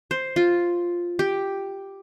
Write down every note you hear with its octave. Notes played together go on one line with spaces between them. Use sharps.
C5
F4
G4